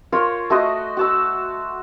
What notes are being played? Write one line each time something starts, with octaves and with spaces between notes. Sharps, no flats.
F4 A#4 C5 C#5
A3 F#4 C5 D#5
F#4 A5 E6